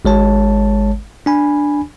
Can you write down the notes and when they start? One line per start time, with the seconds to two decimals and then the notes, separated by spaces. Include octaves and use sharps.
0.05 G#1 G#3 C#5 A5
1.26 D4 G#5 B5